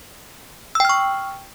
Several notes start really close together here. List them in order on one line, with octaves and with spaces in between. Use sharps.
E6 G5 F6 C#6